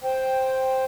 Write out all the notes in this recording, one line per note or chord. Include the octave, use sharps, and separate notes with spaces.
C5 G5